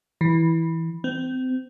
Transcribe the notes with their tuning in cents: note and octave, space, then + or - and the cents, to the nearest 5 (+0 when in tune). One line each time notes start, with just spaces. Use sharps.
E3 -10
C4 -25